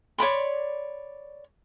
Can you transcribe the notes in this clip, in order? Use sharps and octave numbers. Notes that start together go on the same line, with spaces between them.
C#5 D5 B5 C6